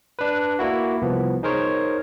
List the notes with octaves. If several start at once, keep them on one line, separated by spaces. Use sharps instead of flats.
D4 B4
A#3 E4 F#4
C2 F3 B3
D#4 G#4 A#4 C5 C#5